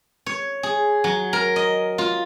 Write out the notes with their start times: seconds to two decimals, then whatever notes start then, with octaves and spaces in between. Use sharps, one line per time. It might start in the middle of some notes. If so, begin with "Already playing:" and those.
0.26 C#5
0.63 G#4
1.04 F#3
1.33 A#4
1.56 D#5
1.98 F4